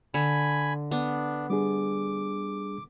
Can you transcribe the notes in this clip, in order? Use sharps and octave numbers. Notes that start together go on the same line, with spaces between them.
D3 G#5 B5
B3 D4
G3 D4 G#4 D6